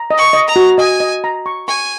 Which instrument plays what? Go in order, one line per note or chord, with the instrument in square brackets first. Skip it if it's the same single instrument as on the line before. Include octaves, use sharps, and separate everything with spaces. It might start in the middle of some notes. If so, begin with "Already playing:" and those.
Already playing: [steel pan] A#5
D#5
[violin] C#6
[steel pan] D#5
[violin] A#5
[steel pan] F#4
[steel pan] D#5 [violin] G#5
[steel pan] D#5
A#5
C#6
[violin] G#5 [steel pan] C#6